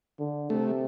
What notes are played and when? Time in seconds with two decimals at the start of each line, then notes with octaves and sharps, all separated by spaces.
0.19 D3
0.50 C3 A3